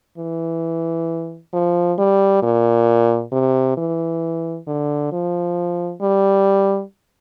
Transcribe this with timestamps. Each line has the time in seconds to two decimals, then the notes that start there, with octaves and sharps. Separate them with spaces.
0.18 E3
1.53 F3
1.98 G3
2.43 A#2
3.32 C3
3.77 E3
4.67 D3
5.12 F3
6.02 G3